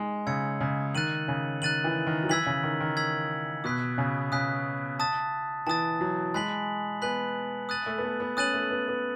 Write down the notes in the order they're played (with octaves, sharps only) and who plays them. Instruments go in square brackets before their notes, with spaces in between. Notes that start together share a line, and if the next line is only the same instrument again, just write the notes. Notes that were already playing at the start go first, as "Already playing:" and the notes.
Already playing: [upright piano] G#3 D#4
[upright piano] C#3 [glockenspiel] E6 G#6 C#7
[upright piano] C#3
[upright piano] D#3 [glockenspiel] F#6 A6 D#7 F#7
[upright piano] C#3
[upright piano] D#3 [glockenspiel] F#6 A6 D#7 F#7
[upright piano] E3
D#3
F#3
[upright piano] E3 [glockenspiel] E6 G#6 B6 F#7
[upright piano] C#3
D#3
D#3
[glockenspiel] E6 G#6 B6 F#7
[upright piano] B2 [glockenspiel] D#6 F#6 B6
[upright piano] C#3
[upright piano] C#3 [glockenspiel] D#6 F#6 B6
[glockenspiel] A5 D#6 A6
[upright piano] E3 [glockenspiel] A5 D#6 A6
[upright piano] F#3
[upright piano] G#3 [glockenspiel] G#5 B5 F#6 B6 F#7
[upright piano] B3 [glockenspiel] G#5 B5 F#6 B6 F#7
[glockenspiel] D#6 F#6 A6 D#7 F#7
[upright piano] A3
B3
A3
B3
[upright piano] C#4 [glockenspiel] D#6 F#6 A6 D#7 F#7
[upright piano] A3
B3
B3